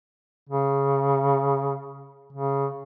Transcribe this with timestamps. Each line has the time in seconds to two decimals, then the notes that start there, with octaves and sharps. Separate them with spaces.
0.49 C#3
2.32 C#3